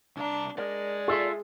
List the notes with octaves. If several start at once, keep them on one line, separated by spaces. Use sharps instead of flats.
C2 D4 A#5
G#3 A#4 D5
F4 G#4 A4 E5